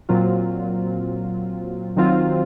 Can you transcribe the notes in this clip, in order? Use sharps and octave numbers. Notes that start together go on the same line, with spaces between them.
A#2 F#3 C4 F4
D#3 F#3 C4 F4